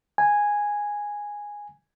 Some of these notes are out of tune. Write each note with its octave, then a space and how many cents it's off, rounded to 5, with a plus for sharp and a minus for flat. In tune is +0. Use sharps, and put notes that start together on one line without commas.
G#5 -5